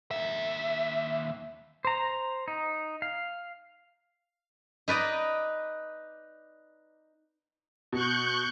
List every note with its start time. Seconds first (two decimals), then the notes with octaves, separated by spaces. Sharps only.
0.11 D#2 E5
1.85 C5 A#5
2.48 D#4
3.02 F5
4.88 D#4 B4 D5 D#5
7.93 B2 C#6 F#6 G6